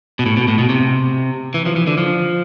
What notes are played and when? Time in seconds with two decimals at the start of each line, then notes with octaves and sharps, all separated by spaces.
0.19 B2
0.26 A2
0.37 B2
0.48 A2
0.59 B2
0.69 C3
1.54 E3
1.66 F3
1.76 E3
1.87 D3
1.98 F3